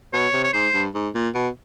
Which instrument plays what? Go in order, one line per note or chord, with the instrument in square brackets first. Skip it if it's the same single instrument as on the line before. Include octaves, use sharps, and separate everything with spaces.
[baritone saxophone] B2 [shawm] C#5
[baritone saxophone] C3
[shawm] C#5
[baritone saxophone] G#2 [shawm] C5
[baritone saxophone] G2
G#2
A#2
B2